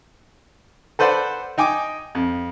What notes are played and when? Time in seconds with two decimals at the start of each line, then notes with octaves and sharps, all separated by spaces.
0.99 A4 B4 C5 D5 F#5
1.58 D#4 G5 G#5 D6
2.15 F2